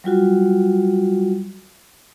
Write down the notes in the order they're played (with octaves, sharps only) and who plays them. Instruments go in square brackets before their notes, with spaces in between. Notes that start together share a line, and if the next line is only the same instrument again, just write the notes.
[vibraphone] F#3 G3 F4 F#4